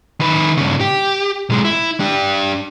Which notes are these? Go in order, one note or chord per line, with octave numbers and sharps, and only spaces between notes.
D#3 B4
G2 C#3
G4
B1 G#3
E4
D4 G4